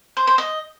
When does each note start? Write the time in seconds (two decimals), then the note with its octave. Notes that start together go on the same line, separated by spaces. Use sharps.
0.17 C5
0.27 C5
0.38 D#5